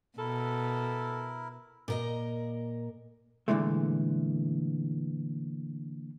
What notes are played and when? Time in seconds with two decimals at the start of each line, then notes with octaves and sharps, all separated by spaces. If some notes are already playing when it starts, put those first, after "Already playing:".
0.18 B2 E4 A4 A#4
1.88 A#2 A#4 D#5
3.48 A#2 D3 E3 G#3 A3